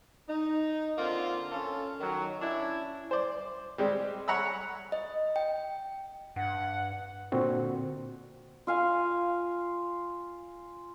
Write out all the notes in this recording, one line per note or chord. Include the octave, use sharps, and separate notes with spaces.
D#4
D3 A#3 C4 F4
C#4 F4 A4
D#3 F#3
C#4 D4 E4
C5 D5
G3 G#3 C4
C#5 F#5 A#5 B5 E6
D#5
G5
G2 F#5
A#2 D3 C4 F#4
F4 F5 G#5